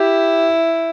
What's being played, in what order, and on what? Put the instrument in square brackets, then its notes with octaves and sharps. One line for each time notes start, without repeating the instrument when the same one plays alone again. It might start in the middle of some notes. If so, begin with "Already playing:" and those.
Already playing: [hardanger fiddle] E4 [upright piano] G4